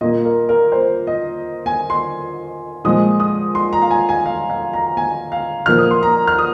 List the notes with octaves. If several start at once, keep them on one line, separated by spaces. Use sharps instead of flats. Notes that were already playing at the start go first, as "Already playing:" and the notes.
A#2 A#3 D#5
A#4
A#4
C5
D#5
G#5
C6
A#2 F3 G#3 D#6
D#6
C6
A#5
F5
G#5
G#5
F5
F5
A#5
G#5
F5
A#2 F3 A#3 F6
D#6
C6
A#5
F6
D#6